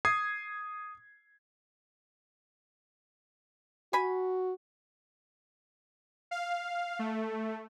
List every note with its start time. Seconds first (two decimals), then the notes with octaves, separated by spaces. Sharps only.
0.05 D#6 G#6 C7
3.93 F#4 G#5 B5
6.31 F5
6.99 A3